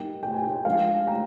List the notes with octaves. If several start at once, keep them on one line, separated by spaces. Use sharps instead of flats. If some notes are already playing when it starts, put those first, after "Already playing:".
Already playing: G3 A#3 D#4 G5
G5
G#5
G5
F3 G#3 D4 F4 F5 G#5
G5 A#5